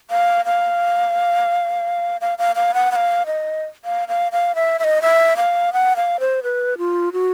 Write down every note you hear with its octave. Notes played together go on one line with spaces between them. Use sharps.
F5
F5
F5
F5
F5
F#5
F#5
F5
D#5
F5
F5
F5
E5
E5
D#5
E5
F5
F#5
F5
C5
B4
F4
F#4